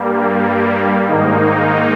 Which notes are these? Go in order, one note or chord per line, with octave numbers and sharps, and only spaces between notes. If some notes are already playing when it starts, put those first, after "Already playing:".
Already playing: G2 G3 A#3
G#2 D#3 A#3 D#4